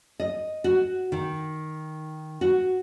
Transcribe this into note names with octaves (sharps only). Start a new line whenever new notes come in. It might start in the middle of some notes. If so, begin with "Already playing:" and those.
D#5
F#4
D#3
F#4